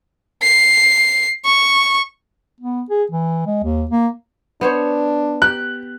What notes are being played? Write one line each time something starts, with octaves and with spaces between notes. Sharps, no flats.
C7
C#6
B3
G#4
E3
G#3
D#2
A#3
B3 D4 C5 C#5
G4 F#6